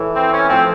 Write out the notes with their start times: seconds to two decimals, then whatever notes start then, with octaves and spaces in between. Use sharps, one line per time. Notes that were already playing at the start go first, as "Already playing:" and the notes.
Already playing: A2 E3
0.15 C4
0.33 C#4
0.49 A2 F3 C4